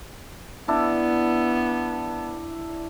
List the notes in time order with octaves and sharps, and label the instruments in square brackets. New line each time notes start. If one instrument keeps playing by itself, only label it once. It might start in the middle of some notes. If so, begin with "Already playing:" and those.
[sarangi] B3 [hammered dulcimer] D4 E4